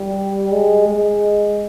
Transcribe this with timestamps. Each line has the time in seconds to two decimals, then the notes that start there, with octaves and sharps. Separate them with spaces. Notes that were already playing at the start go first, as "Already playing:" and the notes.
Already playing: G3
0.52 G#3
0.88 G#3